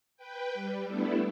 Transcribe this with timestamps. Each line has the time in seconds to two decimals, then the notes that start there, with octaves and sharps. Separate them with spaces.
0.17 B4 G5
0.54 G3
0.87 G3 A3 B3 D4 E4 A4